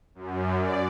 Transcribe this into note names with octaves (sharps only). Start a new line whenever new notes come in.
F#2
D5